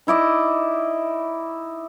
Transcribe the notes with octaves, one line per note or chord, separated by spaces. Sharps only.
D#4 E4 D5 D#5